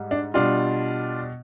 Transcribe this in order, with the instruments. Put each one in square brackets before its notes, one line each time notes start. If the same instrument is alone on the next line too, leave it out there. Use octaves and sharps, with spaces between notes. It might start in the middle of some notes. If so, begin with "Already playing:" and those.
Already playing: [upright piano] G#2 G3
D4
B2 G3 D4 F4